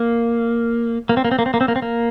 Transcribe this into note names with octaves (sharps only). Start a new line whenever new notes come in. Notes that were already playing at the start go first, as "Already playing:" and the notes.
Already playing: A#3
A#3
C4
A#3
C4
A#3
C4
A#3
C4
A#3
C4
A#3